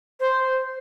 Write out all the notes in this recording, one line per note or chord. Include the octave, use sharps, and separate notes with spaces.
C5